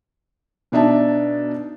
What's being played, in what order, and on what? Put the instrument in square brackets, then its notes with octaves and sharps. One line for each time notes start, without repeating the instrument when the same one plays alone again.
[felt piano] B2 D4 D#4 E5 A5